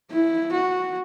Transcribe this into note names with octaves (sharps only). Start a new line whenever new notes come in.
E4
F#4